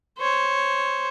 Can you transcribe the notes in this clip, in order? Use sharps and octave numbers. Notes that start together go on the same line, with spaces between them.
C5 C#5